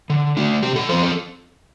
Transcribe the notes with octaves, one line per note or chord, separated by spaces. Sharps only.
D3
A3 D4
C3 G4
A4
F3 C4 C5
A4